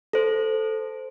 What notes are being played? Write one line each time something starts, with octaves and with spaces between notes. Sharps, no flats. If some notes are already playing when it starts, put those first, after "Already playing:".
A4 C5